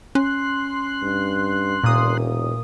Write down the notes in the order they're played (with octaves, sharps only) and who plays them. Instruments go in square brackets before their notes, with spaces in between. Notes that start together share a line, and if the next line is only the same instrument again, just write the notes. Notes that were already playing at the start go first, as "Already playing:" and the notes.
[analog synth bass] C#4 [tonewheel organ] C6 F#6
[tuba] G2
[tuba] E1 [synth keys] A#2 D#6